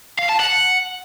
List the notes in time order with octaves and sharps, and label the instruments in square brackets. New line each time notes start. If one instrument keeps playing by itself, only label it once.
[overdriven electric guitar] F5
A5
F#5